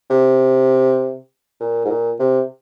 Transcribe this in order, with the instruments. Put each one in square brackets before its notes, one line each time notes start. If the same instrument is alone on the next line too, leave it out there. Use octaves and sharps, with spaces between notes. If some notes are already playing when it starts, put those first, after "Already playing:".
[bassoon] C3
A#2
G#2
A#2
C3